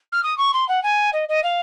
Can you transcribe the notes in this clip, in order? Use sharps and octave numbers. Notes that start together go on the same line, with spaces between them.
F6
D#6
C#6
C6
F#5
G#5
D#5
D#5
F5